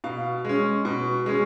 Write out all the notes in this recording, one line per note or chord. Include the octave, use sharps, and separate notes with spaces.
B2 F5
G#3 C#4
B2
G#3 C#4